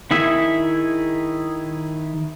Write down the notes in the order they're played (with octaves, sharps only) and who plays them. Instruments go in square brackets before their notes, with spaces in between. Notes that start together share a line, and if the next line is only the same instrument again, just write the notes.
[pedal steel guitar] D#3 E4 G#4 E5